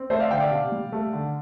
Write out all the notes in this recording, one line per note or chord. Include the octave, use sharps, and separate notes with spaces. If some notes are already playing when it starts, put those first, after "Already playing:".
Already playing: C4
A3 C5 E5
D5 F5
D3 E5 G5
D5 F5
C3
G3
A3
D3